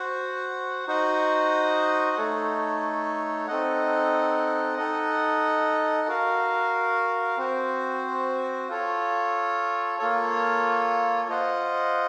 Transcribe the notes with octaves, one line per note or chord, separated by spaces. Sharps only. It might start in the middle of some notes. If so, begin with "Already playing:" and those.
Already playing: F#4 C5 F#5
D#4 F#4 C5 D#5 F#5
A3 D#4 A4 C#5
C4 D#4 A4 D#5 F#5
D#4 A4 D#5 F#5
F#4 A#4 F5
C4 F#4 C5
F4 A4 C#5
A#3 F4 A4 C#5
F4 C5 D#5 F#5